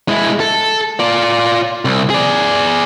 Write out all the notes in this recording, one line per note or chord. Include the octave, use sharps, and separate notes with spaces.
G#3 E4
A4
F4 D5
C2
G#4 D5